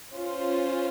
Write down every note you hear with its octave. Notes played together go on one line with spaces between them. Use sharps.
C#4 F4 C5